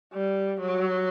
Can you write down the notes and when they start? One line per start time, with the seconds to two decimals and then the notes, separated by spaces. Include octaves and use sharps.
0.13 G3
0.61 F#3